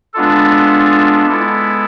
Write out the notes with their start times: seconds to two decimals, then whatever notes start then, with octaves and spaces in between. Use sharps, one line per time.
0.14 G#3 B3 D4 F4 A4
1.26 G#3 B3 E4 A4